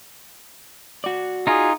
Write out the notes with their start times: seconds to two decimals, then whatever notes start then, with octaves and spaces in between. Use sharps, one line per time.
1.04 F#4 D5
1.47 D#4 F4 G#4